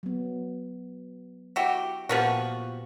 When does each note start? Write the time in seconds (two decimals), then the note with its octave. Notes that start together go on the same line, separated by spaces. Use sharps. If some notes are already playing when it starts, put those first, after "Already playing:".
0.03 F#3 B3
1.56 E4 F#4 G4
2.09 A#2 F3 B3 F#4 G4